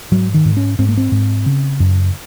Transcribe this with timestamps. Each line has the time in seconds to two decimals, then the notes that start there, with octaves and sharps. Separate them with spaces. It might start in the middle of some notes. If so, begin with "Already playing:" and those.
0.11 G#2 F#3
0.34 D#3
0.45 G#2
0.57 C#4
0.79 G#2 C4
0.89 A#3
0.97 C4
1.12 G#2
1.46 C#3
1.80 F#2